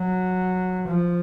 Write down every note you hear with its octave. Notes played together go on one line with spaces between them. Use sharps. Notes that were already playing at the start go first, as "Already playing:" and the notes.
Already playing: F#3
F3